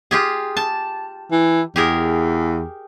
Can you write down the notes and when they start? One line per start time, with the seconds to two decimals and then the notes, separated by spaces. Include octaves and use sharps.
0.11 F4 G4 G#4
0.57 A5
1.32 E3
1.76 E2 G4 G#4 A#4